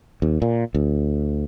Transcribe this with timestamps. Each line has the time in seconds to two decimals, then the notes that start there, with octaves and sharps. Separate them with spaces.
0.22 D#2
0.42 A#2
0.75 D2